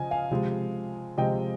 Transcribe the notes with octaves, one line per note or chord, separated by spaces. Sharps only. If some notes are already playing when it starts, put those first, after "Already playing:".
Already playing: C#3 F3 D#5 G#5
F5 G#5
C3 F3 G#3
C3 F3 G#3 D#5 G5